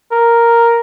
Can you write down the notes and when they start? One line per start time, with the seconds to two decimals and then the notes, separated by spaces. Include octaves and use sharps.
0.12 A#4